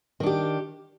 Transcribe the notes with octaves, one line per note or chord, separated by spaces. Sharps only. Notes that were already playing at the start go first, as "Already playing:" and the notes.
D#3 D4 G4